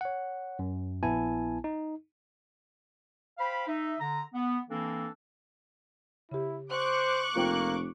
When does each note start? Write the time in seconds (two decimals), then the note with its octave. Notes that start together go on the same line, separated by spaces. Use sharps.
0.01 C#5 F#5
0.59 F#2
1.03 A#1 B3 E4 G#5 A5
1.64 D#4
3.39 C5 F5 G5 B5
3.68 D#4 E5
3.99 D3 A#5
4.33 B3
4.69 E3 A#3 C4 D4 A4
6.31 C#3 E4 G4
6.72 C5 C#6 D6 F#6
7.36 F1 A#3 F4 C5 G5